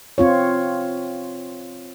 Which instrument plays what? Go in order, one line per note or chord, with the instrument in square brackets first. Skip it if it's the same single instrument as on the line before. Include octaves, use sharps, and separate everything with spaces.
[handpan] C4 F4 C#5